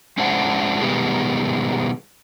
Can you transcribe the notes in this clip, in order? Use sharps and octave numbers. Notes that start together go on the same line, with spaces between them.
G#3 C#4 D4 E4 C5 F#5
B2 D#3 G3 G#3 B3